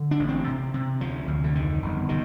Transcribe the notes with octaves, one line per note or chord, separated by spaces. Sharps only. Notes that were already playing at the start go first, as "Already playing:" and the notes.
Already playing: D3
D4
A1
C4
C3
C3
D2 F3
D2
D3
F2 D#3
G1
C3 D#3